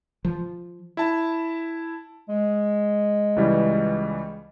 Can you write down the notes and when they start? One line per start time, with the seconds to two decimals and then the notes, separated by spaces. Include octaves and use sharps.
0.25 F3
0.97 E4 A5
2.29 G#3
3.36 C#2 E3 G3